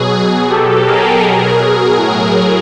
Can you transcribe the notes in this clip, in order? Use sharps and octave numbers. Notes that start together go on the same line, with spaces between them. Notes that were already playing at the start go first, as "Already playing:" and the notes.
Already playing: B2 F#3 G#4
B2 F#3 G4 A4
G#4 A#4
B2 F#3
G#4 A#4
A2 F#3